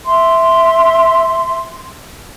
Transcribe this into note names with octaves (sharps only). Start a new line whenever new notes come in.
E5 C6